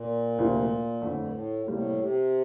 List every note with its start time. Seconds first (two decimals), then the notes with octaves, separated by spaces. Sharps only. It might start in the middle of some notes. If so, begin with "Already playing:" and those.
Already playing: A#2
0.38 D2 C3 F3 A#3 F4
1.02 F2 A2 D3 A3
1.14 G2
1.28 A2
1.66 A2 C3 G3 A#3
1.98 C3